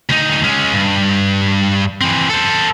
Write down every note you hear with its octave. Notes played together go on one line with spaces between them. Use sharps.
D2 D#4
G#3 C#4
G2
E3 C4
A4 C5